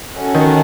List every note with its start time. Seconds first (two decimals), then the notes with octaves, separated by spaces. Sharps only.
0.14 C#4 F#4 A4 D#5 F#5
0.34 D#3